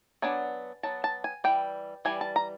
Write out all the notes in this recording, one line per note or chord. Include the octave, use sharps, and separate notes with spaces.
F#3 B3 D4 G#5
F#3 B3 A5
A5
G#5
E3 G3 G5
E3 G3 G#5
A5
A#5